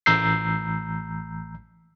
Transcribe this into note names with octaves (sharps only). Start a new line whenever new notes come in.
A1 A#5 E6 G6 C7